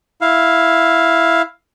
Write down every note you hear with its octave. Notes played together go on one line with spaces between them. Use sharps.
E4 F5